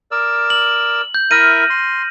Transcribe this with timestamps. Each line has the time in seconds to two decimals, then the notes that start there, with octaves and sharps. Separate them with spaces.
0.11 A#4 D5 E6
0.50 F#7
1.14 G6
1.31 E4 A#4 E5 F6 A#6 D#7
1.70 C6